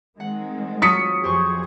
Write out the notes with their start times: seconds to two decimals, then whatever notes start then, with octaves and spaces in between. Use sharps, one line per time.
0.20 D#3 G#3 C4 F#5
0.82 F#3 F4 D#6 B6 C#7
1.24 F2 G4 G#4 C5 C#6